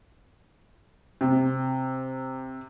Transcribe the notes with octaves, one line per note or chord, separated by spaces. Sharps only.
C3